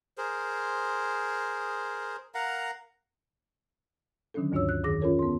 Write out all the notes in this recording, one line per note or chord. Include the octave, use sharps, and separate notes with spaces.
G#4 A#4 C5
A#4 F5 F#5 A#5
D3 D#3 F#3 C#4 D4 A4
D2 G2 D4 F#4 C#5 E6
F#6
F2 D#3 G#4 D6 A#6
C#4 F4 A4 A#4 C#5
B3 C6